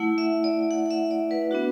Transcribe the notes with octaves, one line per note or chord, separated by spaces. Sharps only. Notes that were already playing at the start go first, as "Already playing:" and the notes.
Already playing: A3 E4 F#5
E5
D5
F#5
F#5
E5
D5
B4
B3 D4 F#4